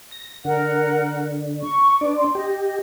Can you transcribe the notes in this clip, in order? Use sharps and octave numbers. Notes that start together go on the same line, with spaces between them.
A#6
D3 A#4 F#5
C#6
D4 B4 D5
C6
G4 D#5